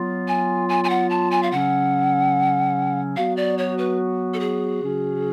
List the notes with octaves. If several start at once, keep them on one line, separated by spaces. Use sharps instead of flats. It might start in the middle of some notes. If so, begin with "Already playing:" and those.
Already playing: F#3 B3 F4
G#5
G#5
G#5
F#5
A5
G#5
F5
C#3 F#3 C#4 F#5
F#3 B3 F#4 F5
D5
C#5
B4
A4
G#4
C#3 F#3 C#4 F#4